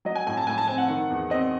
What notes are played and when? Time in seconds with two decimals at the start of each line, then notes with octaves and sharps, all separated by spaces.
0.05 F#3 D#5
0.15 G#5
0.27 A2 G#5
0.37 A5
0.47 A2 G#5
0.58 A5
0.68 C4 G#5
0.78 F#5
0.88 D#3 F#5
1.10 E2
1.30 C4 D#5